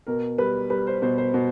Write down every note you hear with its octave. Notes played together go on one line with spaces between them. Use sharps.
B2 A#4
G3 B4
G3 B4
C5
B2 C5
C5
B2